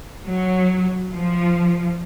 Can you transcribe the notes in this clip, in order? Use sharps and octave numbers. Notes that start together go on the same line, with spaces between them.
F#3
F3